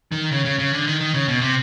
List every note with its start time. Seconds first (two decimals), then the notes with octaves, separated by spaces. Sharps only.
0.12 D#3
0.32 C#3
0.45 C#3
0.59 C#3
0.73 D3
0.87 D#3
1.01 D#3
1.14 C#3
1.28 B2
1.41 C3